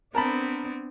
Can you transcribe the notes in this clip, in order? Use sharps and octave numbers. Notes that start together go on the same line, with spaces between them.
B3 C4 D4 A#4 A5 B5